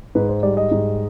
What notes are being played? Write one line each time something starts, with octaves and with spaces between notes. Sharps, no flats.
G#2 B4
C5
G3 D5
D#5
G#2